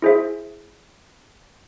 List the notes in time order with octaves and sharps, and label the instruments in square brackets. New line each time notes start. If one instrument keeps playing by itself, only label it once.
[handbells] E4 G#4 C5 E5